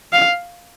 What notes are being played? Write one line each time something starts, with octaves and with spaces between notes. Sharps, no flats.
F5